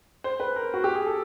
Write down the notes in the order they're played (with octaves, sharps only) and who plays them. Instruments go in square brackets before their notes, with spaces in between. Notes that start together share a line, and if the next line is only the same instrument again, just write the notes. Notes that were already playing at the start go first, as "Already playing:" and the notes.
[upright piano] C5
B4
A#4
F#4
G4
G#4
A4